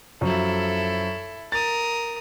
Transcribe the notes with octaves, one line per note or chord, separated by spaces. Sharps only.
F#2 F3 E4 A4
A#4 D#6 A6